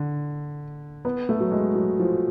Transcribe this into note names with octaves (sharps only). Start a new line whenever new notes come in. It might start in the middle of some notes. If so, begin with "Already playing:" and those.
Already playing: D3
B3
A3
F#3
G#3
F#3
F3